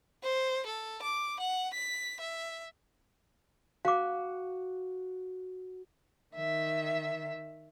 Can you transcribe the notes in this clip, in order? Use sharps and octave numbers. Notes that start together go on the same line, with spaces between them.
C5
A4
D6
F#5
B6
E5
F#4 F5 D6
D#3 E5